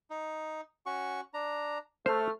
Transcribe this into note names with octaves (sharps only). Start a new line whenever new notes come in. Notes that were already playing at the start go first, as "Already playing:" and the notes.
D#4
C#4 F#4 C#6
D4 A#5
A3 C5 F6